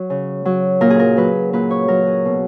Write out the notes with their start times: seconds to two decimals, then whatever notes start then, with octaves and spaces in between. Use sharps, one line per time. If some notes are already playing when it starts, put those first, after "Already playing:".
Already playing: F#3 F#4
0.10 C#3
0.45 F#3
0.81 A#2 A#4
0.90 G#4
0.99 A#4
1.17 F#3 B4
1.53 A#2 B4
1.71 C#5
1.88 F#3 A#4
2.02 F#4 G#4
2.25 B2